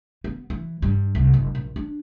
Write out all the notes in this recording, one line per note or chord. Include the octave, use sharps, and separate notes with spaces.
B3
E3
G2
C2
F#1
A#1
D4